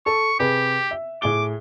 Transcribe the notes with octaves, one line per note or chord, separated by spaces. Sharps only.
A4 C#6
C3 G4 G#4 B4
E5
A2 G#4 D6 G7